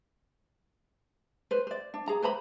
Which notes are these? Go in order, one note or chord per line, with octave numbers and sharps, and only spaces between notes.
B4 C5
C5 D5
D4
G#4 A#5
B4 C5 A#5 B5